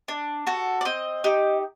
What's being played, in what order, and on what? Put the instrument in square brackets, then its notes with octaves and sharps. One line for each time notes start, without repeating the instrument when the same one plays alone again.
[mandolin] D4
F#4 A4
D5
C4 D#5
D#4 G4